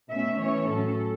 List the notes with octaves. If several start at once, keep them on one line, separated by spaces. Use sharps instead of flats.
B2 A3 C#4 E5
E3 A3 C#4 C#5
A2 F#3 C#4 A4